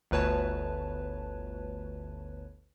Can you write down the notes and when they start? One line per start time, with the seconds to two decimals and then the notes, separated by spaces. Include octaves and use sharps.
0.11 G1 D2 B4 C#5 A5